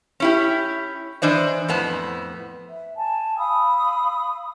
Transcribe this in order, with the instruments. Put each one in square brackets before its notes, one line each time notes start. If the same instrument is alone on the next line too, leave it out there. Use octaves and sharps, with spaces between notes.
[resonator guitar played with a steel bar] C#4 E4 G4
E3 D4 C5 D#5
F2 A2 B3 A5
[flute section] E5
G#5 A5
F5 B5 D#6 E6